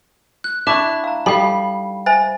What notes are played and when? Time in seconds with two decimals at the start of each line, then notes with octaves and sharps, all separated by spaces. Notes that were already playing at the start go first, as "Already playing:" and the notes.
0.44 F#6
0.67 D4 E4 E5 A5 C#6
1.04 F5 A#5
1.26 G3 D#4 A4 F5 B5
2.06 C5 E5 G#5 A6